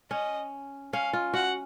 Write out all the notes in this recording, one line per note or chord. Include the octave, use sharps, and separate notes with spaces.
C#4 D#5
C#4 F5
F4
F#4 F#5